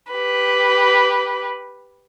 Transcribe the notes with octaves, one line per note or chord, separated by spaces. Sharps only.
G4 B4